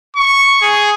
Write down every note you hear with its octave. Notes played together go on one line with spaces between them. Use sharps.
C#6
G#4